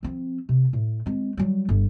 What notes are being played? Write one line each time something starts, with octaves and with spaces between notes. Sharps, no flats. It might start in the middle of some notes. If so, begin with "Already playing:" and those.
F3 C4
C3
A2
G#3 C4
F#3 G3
G1